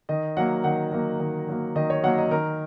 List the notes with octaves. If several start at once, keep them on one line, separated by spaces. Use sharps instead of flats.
D#3 D#5
F#3 A#3 F#5
D#3 F#5
F#3 A#3
D#3
F#3 A#3
D#3 D#5
C#5
F#3 A#3 F#5
D#5
D#3 A#4